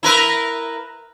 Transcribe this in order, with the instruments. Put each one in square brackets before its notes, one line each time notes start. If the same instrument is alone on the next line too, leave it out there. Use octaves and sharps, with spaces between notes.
[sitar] E4 A#4 B4